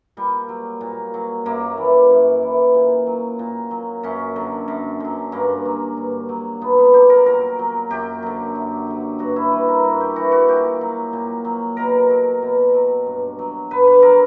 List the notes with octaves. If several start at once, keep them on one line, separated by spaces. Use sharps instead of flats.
A#2 G3
F#3
A#2
F#3
F#2 A#3
E3
F#2
E3
A#2
F#3
A#2
F#3
F#2 C#4
D3 F#3
F#2
D3 F#3
G2 A#3
F#3
G2
F#3
A#2 B3
B3
F#3 G4
A#4
A#2 A#4
F#3
F#2 G4
D3 F#3
F#2
D3 F#3
G2 F#4
E4
E3 B4
A#4
G2 F#4
G4
E3 F#4
F#4
A#2 G4
F#3
A#2
F#3
B2 A#4
F#3
B2
F#3
G2
F#3
G2 B4
B4
F#3 A#4